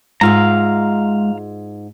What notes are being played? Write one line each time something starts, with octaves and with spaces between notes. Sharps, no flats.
G#2 G#3 F4 E5 F5 A#5